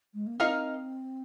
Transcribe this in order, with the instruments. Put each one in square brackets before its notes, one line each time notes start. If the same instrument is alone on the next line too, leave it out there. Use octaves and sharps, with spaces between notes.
[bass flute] G#3
A#3
[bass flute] C4 [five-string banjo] D#4 A#4 F5